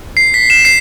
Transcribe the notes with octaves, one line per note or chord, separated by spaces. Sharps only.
C7
B6
E7
C7